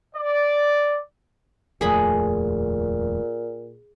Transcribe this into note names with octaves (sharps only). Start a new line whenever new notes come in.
D5
D#1 F2 A#2 A3 G#4 B5